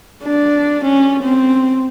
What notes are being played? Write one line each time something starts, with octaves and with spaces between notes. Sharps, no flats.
D4
C#4
C4